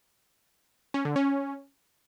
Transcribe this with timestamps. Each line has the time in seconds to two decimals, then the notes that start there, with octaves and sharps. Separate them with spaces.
0.94 C#4
1.05 D3
1.16 C#4